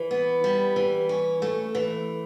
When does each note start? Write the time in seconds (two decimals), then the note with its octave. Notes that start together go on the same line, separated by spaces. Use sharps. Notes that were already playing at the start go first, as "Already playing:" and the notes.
Already playing: E3
0.11 B3
0.44 G3
0.76 E3
1.09 C#4
1.42 A3
1.75 E3